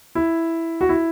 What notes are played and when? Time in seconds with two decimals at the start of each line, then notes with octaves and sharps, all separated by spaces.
0.15 E4
0.81 F#4
0.89 E4